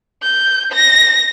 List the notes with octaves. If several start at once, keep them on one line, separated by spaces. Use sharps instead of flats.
G6
A#6